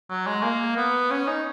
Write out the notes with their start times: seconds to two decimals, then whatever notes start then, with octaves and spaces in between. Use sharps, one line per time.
0.10 F#3
0.27 G#3
0.43 A#3
0.77 B3
1.11 C#4
1.27 D#4